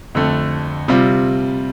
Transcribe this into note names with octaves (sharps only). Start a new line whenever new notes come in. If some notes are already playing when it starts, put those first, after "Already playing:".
F2 D3 A3
C3 G3 C4 F4